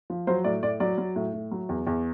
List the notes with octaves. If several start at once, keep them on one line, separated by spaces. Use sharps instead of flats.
F3
F#3 C5
A2 D5
A2 D5
F#3 D5
F#3
A2
A2
F#3
E2
E2